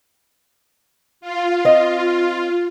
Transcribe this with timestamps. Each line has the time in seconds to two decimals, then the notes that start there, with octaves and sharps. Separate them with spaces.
1.21 F4
1.65 C4 D#5